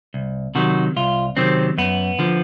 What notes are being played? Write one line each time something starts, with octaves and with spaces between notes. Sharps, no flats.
C2
C3 D#3 F#3 F#4
C2 F4
C3 D#3 F#3 C4
F#2 B3
D3 F3